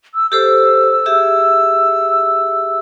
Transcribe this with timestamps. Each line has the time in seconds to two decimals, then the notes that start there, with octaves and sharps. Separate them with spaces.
0.15 E6
0.32 G4 A4 C5 E6
1.06 G4 G#4 E5